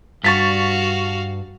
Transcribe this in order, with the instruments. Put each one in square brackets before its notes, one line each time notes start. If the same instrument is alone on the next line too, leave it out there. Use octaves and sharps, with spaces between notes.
[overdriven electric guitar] G2 [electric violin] F#4 F5 [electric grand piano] C#6 A6 B6